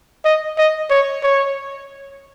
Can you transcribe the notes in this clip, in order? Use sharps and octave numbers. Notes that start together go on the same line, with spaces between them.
D#5
D#5
C#5
C#5